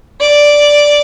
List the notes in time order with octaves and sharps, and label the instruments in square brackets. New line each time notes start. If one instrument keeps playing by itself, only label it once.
[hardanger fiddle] D5